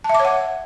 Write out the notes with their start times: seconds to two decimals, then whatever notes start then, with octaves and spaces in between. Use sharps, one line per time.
0.04 A5
0.09 E5
0.15 D6
0.20 C#5
0.25 F#5